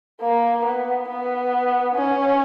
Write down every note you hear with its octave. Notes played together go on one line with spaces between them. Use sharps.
A#3
B3
B3
C#4